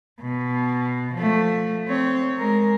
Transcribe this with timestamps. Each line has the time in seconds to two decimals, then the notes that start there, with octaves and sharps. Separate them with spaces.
0.21 B2
1.14 F3 A3
1.88 C4 C#5
2.38 G#3 A#4